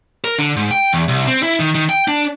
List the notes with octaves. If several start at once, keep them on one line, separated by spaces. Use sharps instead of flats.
A#4
D3
G#2
G5
E2
C2
C4
E4
D#3
D#3
G5
D4